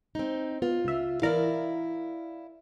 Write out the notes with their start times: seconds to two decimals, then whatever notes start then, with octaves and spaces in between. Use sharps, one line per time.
0.15 C4 D#4
0.62 B3 F4
0.85 C#2 E5
1.22 E3 E4 A#4 D5 F5